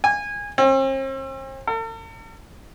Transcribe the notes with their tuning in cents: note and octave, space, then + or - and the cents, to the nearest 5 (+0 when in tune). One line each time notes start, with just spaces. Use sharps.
G#5 -20
C4 +45
A4 +45